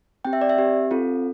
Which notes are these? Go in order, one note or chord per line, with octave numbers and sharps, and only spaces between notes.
C4 G4 G5
E5
D5
E5
C4 G4
C4 F4 A4